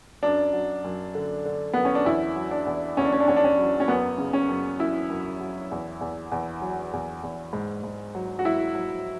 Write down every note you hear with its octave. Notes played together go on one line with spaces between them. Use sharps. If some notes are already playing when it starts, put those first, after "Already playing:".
F#2 D4
F#3
F#2
D3
D3
F#2 B3
C#4
D4
E2 E4
F#3
D4
E2
E2 C#4
D4
C#4
D4
E2 C#4
D4
C#4
F#3
C#4
F#2 B3
C#3
C#4
F#2
F#2 E4
F#2
F#3
E2
E2
E2
F#3
E2
E2
G#2
G#2
F#3
F#4
F#3 E4
F#3